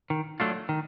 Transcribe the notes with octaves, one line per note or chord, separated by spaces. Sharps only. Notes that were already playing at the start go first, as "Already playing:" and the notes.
D#3
F#3 A3 D4 F4
D#3